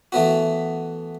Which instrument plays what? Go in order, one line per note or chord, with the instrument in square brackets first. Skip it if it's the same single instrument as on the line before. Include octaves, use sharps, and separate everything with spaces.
[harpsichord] E3 A3 B3 F#4